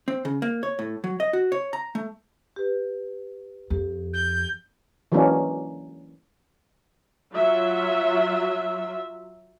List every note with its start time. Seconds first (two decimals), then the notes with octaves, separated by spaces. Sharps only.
0.08 C4
0.25 C#3
0.42 A#3
0.63 C#5
0.79 A2
1.04 F#3
1.20 D#5
1.33 F#4
1.52 C#5
1.73 A#5
1.95 A3
2.56 G4 B4
3.71 F2 G4
4.13 G6
5.12 E3 F#3 G#3 A#3 C#4 D4
7.34 F#3 F4 E5